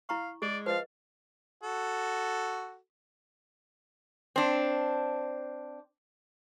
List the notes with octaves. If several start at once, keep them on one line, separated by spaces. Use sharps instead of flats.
E4 F5 A#5 C#6
G#3 G#4 D5
F3 B4 D#5 F5
F#4 A4
C4 D4